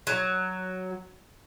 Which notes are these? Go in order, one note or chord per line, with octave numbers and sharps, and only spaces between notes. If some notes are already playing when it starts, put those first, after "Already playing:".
F#3